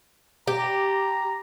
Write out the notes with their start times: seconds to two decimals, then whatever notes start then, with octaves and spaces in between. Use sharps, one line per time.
0.47 G4 A#5